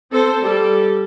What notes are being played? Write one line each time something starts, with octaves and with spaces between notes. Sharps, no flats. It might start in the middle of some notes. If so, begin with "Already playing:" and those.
C4 A4 C5
G3 A4